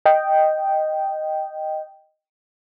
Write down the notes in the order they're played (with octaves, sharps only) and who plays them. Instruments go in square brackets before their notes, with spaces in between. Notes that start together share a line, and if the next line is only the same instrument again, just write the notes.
[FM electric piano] D#5 G5